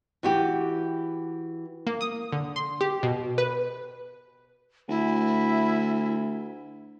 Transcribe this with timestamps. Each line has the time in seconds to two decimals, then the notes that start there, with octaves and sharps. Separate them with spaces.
0.23 E3 F#4 G4
1.87 A#3
2.01 D#6
2.33 D3
2.56 C6
2.81 G4
3.03 B2
3.38 B4
4.89 D2 E4